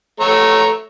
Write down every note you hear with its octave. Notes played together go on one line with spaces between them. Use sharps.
A3 C#5 A#5